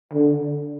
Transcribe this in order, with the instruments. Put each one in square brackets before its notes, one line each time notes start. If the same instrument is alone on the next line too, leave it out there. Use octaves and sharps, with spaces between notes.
[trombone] D3